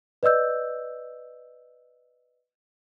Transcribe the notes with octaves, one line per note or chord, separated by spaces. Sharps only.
B4 D5 D#5 E6 G6